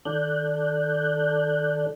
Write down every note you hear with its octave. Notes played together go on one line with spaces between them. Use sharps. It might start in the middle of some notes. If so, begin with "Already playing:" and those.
D#3 A4 D5 F#6 G6